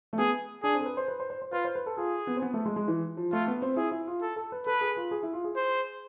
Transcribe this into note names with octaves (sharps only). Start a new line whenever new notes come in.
A3
B3 G#4
D4 G#4
C4
A4
B4
C5
B4
C5
C5
C5
F4 B4
C5
B4
A4
F4 G#4
B3
C4
B3
A3
G#3
G#3
E3
F3
A3 F4
B3
C4
E4 G#4
E4
F4
A4
A4
B4
A4 B4
G#4
F4
G#4
E4
F4
G#4
C5